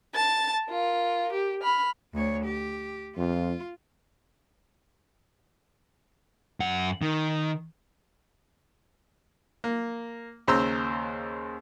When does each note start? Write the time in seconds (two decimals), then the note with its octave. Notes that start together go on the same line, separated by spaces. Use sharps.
0.15 A5 A6
0.68 F4 A#4
1.33 G4
1.62 B5 F6
2.13 D2 C#5
2.44 G4
3.17 F2 F4
6.60 F#2 F#5
7.02 D#3
9.64 A#3
10.48 D#2 C#3 C5 A#5 C6 E6